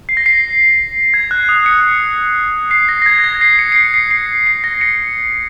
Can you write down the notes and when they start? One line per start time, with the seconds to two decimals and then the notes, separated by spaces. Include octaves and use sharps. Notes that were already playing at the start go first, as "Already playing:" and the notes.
0.09 C7
0.17 A#6
0.26 C7
1.14 G#6
1.31 F#6
1.49 D#6
1.66 C#7
2.71 C7
2.89 A#6
3.02 A#6
3.06 G#6
3.19 G#6
3.24 A#6
3.41 C7
3.59 C#7
3.72 C#7
3.76 C7
3.94 C7
4.11 C7
4.47 C7
4.64 A#6
4.81 C#7